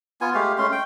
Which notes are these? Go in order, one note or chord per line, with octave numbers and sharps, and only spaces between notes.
B3 F4 G#5
G#3 A3 G4 F5
G#3 A3 C#4 C6
G5